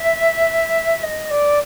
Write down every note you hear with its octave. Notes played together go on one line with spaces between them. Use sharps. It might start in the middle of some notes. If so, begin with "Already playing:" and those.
Already playing: E5
D#5
D5